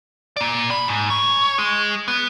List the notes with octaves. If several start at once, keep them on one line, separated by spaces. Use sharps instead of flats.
A#3 D5
E2 B5
G#2
C#5
G#3
B3